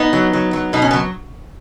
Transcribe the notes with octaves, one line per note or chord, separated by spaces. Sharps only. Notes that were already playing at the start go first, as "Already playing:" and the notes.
Already playing: B3 D#4
F#3
F#3
F#3
B2 D#4
C#4
F#3 B3